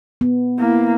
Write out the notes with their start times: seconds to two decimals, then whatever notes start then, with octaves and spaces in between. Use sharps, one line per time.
0.21 B3
0.59 A#3 E4